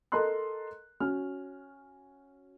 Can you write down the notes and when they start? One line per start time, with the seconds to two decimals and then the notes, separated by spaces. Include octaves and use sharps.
0.12 A4 A#4 D#5 A#5 C6 F#6
1.00 C#4 F#4 F6